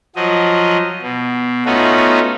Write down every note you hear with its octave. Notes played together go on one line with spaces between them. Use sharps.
F3 F#3 D#5
B2
A3 B3 C#4 D#4 F4 F#4